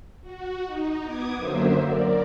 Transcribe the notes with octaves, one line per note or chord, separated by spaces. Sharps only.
F#4
D#4
B3 D6 D#6 G#6
F#2 D3 F#3 A#3 C5 E5
A#4 D5